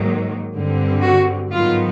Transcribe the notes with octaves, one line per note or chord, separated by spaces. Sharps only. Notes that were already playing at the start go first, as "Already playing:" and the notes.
Already playing: G#2 D#3 F#3 A#3
G2 D3 G3 C4
F#4
G#2 D#3 F#3 B3 F4